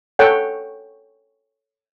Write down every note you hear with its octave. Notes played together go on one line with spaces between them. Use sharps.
A4 C#5 F#5 G5